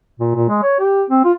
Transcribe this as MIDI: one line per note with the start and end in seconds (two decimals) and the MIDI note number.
0.20 0.31 46
0.35 0.48 46
0.49 0.59 56
0.63 0.77 73
0.79 1.03 67
1.10 1.23 60
1.25 1.32 65